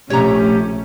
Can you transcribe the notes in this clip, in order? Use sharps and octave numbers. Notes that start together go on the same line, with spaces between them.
A#1 C3 A3 C#4 G4 C#5 A#5